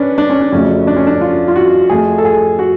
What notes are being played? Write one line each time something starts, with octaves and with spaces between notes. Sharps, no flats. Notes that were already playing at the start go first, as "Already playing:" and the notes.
Already playing: C#4 D4 B4
D4
C#4
D4
F2 C#3 F#3 A3 C#4
D4
C#4
D4
F4
F4
F#4
F2 F3 A3 G#4
A4
G#4
F#4